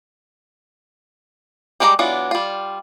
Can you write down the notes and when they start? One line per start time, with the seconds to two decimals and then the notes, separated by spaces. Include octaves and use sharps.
1.80 G3 G#3 G4 A#4 A#5
1.99 E3 F#3 B3 D4 F4
2.31 G3 F4